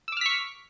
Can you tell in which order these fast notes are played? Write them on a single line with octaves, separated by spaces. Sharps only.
E6 D6 F6 B6 C#6